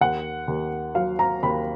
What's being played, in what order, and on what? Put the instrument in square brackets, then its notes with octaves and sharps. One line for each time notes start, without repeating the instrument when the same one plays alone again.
[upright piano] D#2 F#5
D#2
F#3 F5
A#5
D#2 B5